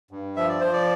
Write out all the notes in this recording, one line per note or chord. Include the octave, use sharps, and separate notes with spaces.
G2
F3 E5
D5
F3 C5
D5